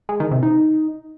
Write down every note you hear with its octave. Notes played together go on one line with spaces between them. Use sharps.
G#3
D#3
C3
D#4